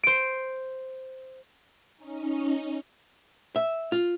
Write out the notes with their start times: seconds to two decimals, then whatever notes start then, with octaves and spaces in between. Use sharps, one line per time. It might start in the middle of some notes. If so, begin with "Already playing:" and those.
0.03 C5 D7
1.97 C#4 D#4
3.56 E5
3.92 F4